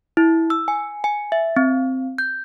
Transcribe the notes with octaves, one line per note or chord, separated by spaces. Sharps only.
E4
E6
G#5
G#5
E5
C4
G6